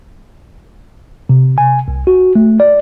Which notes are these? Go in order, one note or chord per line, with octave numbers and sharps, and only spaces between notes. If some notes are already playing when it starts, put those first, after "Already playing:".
C3
G#5
C2
F#4
A3
D5